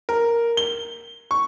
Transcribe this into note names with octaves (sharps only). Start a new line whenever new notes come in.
A#4
G7
C#6